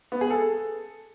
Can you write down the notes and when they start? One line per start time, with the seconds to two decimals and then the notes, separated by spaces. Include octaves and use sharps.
0.12 B3
0.21 G#4
0.30 A4